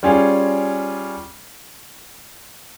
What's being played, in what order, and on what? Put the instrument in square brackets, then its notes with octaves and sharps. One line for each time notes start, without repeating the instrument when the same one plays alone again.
[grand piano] G3 C#4 F4 G#4